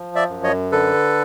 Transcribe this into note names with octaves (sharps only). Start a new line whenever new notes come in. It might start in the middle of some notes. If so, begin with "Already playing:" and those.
Already playing: F3
D5 E5
F#2
C#5 D#5
D3 A4 B4